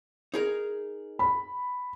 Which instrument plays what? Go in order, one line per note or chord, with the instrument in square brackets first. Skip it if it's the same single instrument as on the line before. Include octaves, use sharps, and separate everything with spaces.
[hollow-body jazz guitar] D#4 G#4 A#4
[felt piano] B5